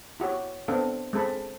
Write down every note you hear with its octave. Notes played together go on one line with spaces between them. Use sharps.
E4 F#4 G4 C#5
B3 C4 D4 A4 F5
G#3 C4 A4 A5 B5